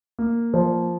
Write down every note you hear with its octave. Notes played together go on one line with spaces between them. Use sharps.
A#3
F3